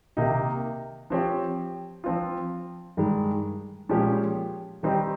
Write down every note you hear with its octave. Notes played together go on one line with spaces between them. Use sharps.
C3 D#3 A#3 D#4 G4
F3 C4 G4 C#5
F3 C4 F4
G2 D#3 G#3
A#2 F3 G#3 C#4 G4
D#3 G3 C4 D#4 G4